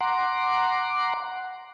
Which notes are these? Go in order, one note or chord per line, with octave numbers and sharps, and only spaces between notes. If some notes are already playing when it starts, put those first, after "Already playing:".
F#5 A#5 C6 D6